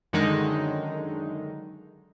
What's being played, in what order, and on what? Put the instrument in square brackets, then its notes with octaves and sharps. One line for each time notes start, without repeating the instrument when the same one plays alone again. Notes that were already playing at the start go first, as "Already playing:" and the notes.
[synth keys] F#2 D3 D#3 G#3 D#4